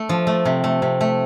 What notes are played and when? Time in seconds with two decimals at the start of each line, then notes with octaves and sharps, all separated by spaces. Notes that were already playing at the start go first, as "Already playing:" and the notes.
Already playing: A3
0.09 F3
0.27 A3
0.45 C3
0.64 A3
0.82 C3
1.01 A3